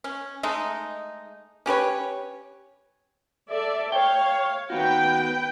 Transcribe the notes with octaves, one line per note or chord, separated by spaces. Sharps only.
C#4
G#3 A3 D#4
C#4 G4 B4 C#5
A4 D5 E5
C#5 F5 G5
D#3 B3 F#4 B4 G5